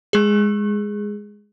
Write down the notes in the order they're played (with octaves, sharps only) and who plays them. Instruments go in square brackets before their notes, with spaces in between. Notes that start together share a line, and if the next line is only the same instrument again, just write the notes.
[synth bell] G#3 G#4